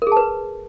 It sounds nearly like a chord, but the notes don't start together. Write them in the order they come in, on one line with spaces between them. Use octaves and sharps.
A#4 G#4 A5 B4